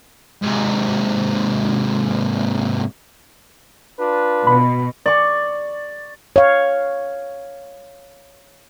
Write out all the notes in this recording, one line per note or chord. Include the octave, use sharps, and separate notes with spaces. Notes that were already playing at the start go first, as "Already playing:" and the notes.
G#2 C3
D4 F4 B4
B2 B5
D5 C#6
C#5 F5